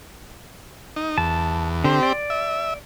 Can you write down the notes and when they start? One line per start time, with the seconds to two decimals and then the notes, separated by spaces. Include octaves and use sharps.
0.96 D#4
1.18 E2 A5
1.84 D3 C4 G4
2.03 D5
2.30 E5